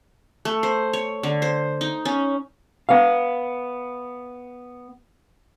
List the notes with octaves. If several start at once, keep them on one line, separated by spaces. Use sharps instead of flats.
A3
C5
C#5
D3
C5
D#4
C#4
B3 F5